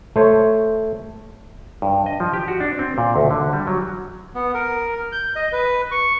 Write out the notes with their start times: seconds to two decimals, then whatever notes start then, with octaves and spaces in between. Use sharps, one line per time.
0.16 A3 C5 C#5
1.82 G2
2.06 D#5
2.20 F3
2.33 G4
2.48 F#4
2.60 D4
2.79 C4
2.98 A#2
3.16 D2
3.31 D3
3.53 G3
3.67 F#3
4.35 B3
4.54 A#4
5.12 G6
5.36 D#5
5.53 B4
5.91 C#6